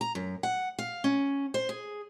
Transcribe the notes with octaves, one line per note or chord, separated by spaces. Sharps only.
A#5
F#2
F#5
F5
C#4
C5
G#4